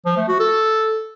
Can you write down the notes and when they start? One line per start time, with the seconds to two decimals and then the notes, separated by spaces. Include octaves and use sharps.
0.06 F3
0.17 A3
0.28 F#4
0.40 A4